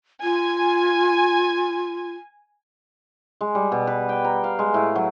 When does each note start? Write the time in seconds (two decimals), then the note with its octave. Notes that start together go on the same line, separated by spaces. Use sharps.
0.23 F4 G#5
3.41 G#3
3.55 G3
3.72 B2
3.87 B4
4.09 G5
4.24 A#5
4.44 F5
4.59 G#3
4.74 A2
4.95 F#3